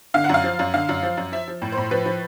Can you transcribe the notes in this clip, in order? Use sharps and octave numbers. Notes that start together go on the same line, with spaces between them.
D3 F5
F#5
F#2 F5
F3
F#2
D3 F5
F#2
F3
F#2
F3 E5
F3
A2
C5
A2
F3 B4
F3